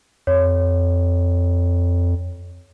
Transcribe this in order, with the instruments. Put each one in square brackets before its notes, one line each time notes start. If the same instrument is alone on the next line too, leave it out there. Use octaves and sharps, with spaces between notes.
[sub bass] F2 [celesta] C#5